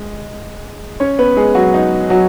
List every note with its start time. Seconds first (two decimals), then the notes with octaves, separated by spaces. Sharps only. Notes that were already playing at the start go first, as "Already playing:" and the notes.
Already playing: G#3
1.00 C#4 C#5
1.19 B3 B4
1.37 G#3 G#4
1.55 F#3 F#4
1.74 D#4
2.10 F#3 F#4